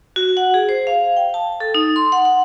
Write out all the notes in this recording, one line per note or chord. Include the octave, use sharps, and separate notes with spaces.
F#4
F#5
G#4
C5
F5
G5
A5
A4
D#4
C6
F#5
F#5